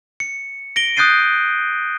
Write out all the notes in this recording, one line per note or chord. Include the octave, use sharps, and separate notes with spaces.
C#7
A#6 D7 G7
D#6 F#6 G6 A6 C7 D#7